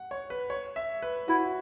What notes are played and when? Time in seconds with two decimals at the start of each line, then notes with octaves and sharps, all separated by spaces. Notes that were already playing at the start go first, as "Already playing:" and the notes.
Already playing: F#5
0.11 C#5
0.30 B4
0.50 C#5
0.76 E5
1.02 B4
1.28 E4 F#4